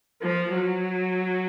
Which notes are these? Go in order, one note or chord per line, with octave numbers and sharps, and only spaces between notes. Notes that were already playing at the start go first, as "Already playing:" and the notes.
F3
F#3